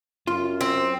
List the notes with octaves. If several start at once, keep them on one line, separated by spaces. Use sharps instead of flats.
F#2 F4
C4